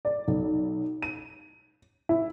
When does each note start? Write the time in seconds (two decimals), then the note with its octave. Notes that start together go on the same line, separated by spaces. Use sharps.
0.05 D5
0.28 B1
1.02 D#7
2.09 E4